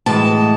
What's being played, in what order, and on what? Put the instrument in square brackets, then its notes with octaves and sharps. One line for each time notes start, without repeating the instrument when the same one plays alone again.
[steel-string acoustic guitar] A2 E3 G#3 A5